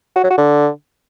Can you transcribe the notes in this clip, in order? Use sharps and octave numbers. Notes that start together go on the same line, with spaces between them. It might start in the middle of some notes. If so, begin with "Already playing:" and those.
F#4
F#3
F#4
D3